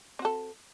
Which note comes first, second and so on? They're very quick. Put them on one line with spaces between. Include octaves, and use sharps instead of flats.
C4 F#4 A4